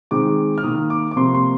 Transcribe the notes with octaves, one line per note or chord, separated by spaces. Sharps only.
D#3 G#3 C4 D6
F6
D#3 A#3 D#6
D6
D6
C3 F3 A#3 C6
C6